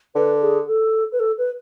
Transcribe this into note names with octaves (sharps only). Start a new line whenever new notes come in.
D3 B4
G#4
A4
B4
A4
B4